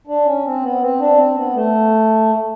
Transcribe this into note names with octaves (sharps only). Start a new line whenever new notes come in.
D4
C#4
C4
B3
C4
D4
C4
B3
A3